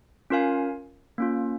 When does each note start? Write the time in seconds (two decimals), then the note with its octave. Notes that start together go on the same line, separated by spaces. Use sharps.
0.30 C#4 F4 A#4 F5 G#5
1.18 A#3 C#4 F4